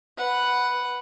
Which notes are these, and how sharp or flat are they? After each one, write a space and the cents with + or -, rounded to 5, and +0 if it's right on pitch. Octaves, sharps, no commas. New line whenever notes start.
B4 +0 F#5 +0